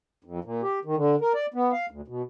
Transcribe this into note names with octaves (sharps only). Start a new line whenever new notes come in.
F2
A#2
G4
D#3
D3
A#4
D5
B3
F5
D2
B2